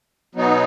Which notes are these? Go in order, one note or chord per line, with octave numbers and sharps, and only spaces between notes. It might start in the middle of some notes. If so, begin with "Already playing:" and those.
B2 F#3 B3 D#4